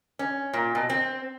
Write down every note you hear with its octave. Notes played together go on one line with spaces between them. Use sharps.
C#4
A#2
B2
C4